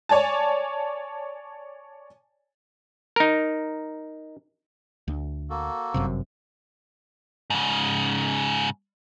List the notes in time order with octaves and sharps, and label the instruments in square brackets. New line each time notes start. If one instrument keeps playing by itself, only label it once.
[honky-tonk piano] C#5 D5 G#5 A5
[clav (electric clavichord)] D#4 A#4
[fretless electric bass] D2
[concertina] A#3 F#4 A4
[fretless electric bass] G1 F#2 C3
[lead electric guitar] G#2 C#3